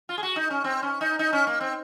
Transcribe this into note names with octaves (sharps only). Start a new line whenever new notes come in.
F4
G#4
F#4
D#4
C#4
C4
C#4
D#4
D#4
C#4
A#3
C4